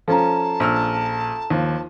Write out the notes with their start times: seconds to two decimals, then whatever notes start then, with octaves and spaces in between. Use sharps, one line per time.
0.08 F3 C#4 A4 A5 A#5
0.60 A#1 E6 F6
1.50 D#2 D#3 F3